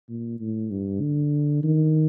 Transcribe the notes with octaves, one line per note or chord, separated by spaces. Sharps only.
A#2
A2
G2
D3
D#3